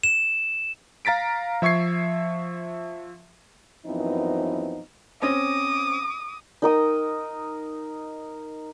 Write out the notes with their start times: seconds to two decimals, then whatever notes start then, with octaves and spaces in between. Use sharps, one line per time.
0.03 E7
1.05 F5 A#5 A6 B6 D7
1.62 F3 E5 C#6 G#6 C7
3.86 F#2 E3 F3 B3 C4 D#4
5.22 C4 C#4 D6 D#6 A#6
6.62 D#4 A#4 D#6